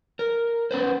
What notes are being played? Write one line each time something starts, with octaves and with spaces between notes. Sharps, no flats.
A#4
B3 C#4 B4 C5